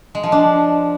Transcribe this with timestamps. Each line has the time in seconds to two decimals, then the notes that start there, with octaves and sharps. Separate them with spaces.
0.15 G#3
0.23 F3
0.32 D4